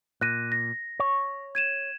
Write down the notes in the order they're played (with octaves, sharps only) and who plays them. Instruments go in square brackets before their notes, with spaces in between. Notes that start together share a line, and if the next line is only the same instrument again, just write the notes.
[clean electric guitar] A#2 [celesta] F#6 A#6 D#7
[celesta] A#6
[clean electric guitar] C#5
[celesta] G#6 D#7 E7